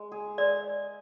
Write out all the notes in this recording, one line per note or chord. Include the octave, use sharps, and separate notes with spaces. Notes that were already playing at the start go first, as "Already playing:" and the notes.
Already playing: G#3
G#4
G#3 D5